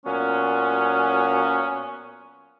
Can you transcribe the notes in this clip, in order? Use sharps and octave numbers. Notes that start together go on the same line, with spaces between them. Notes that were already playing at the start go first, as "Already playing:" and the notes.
A#2 F#3 B3 C#4